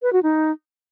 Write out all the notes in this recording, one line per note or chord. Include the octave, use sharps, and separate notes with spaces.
B4
F#4
D#4